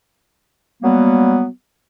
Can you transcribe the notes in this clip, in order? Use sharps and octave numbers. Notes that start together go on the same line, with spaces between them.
F#3 G3 A#3 B3